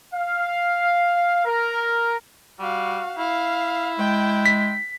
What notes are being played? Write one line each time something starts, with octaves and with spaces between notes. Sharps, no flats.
F5
A#4
G3 F#4 F5
E4 F5
G#3 G5
B6